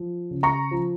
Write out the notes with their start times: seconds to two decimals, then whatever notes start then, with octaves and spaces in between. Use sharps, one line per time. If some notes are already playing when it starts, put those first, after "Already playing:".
Already playing: F3
0.31 C#3
0.43 A#5 C#6
0.71 F3